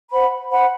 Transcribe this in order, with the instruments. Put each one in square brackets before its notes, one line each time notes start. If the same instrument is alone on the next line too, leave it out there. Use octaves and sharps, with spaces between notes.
[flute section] C5 F#5 B5
C5 F#5 B5